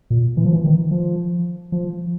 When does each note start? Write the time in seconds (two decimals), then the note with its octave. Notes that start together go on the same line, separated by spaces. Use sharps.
0.10 A#2
0.37 E3
0.45 F3
0.53 E3
0.64 D#3
0.91 F3
1.72 F3